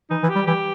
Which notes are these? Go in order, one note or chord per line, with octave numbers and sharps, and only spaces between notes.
E3 D#4
E3
G4
G3
E3 G4